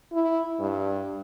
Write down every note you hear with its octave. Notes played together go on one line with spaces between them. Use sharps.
E4
G2